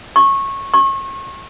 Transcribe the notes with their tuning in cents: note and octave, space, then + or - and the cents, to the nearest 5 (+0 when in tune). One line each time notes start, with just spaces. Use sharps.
C#6 -20
C#6 -35